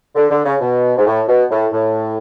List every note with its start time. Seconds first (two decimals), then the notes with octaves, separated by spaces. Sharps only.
0.15 D3
0.30 D3
0.45 C#3
0.61 B2
0.97 G#2
1.06 A2
1.28 B2
1.51 A2
1.72 A2